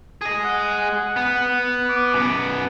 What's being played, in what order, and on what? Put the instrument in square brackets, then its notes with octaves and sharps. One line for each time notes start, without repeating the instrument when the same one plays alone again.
[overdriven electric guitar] G#4 D#5
[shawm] F#5
[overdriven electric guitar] B3
[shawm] D6
[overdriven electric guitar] F#2 B3